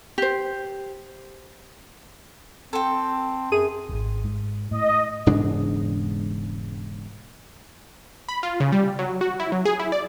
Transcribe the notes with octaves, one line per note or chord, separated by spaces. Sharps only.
G4 C5
C4 A4 G5
F#2 G#4 D#7
D#1 G#1
G#2
A2 D#5
E1 G#2 C#3 D4
B5
F4
C#3
G3
F#3
F#4
E4
F#3
G#4
E4
D5